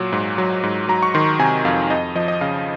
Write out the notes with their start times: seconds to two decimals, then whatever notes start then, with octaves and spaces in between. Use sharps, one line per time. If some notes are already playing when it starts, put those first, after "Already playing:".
Already playing: A#2 F#3
0.13 G#2
0.38 F#3
0.63 G#2
0.89 F#3 A#5
1.03 C#6
1.14 D#3 C6
1.39 C3 G#5
1.65 F2 F5
1.90 F2 D#5
2.15 F3 D#5
2.28 D#5
2.41 C#3 F5